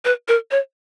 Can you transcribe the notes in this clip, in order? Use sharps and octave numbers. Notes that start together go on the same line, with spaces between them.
B4
A#4
C#5